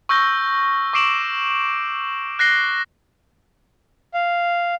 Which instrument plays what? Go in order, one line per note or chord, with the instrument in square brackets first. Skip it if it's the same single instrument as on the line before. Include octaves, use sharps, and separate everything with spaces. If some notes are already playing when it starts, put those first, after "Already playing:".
[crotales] C#6 E6 F6 G6 A#6 G7
C#6 D6 C7 D7 E7 F#7
F#6 A#6 C7 G7
[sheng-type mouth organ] F5